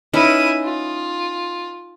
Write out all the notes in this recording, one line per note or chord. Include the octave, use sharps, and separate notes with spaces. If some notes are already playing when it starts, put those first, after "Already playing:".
C#4 D#4 E4 B4 D#7
F4